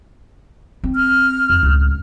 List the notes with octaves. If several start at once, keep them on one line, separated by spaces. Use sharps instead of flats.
C4
F6
F2
C#2 A2